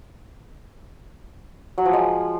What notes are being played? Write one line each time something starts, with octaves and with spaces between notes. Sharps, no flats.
F#3
F3
G#3